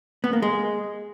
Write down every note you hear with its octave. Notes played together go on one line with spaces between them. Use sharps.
B3
A#3
G#3